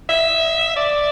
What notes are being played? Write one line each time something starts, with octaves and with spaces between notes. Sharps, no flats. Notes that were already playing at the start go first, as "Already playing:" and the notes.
E5
D5